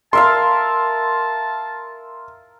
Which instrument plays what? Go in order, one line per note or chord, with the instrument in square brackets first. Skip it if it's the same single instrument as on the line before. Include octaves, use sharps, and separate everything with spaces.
[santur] A#4 E5 F5 [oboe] A5 [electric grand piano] C6